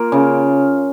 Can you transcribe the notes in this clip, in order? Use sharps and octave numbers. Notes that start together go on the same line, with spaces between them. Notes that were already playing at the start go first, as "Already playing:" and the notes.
Already playing: A#3 F4
C#3